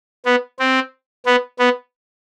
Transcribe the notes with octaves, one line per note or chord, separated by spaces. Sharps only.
B3
C4
B3
B3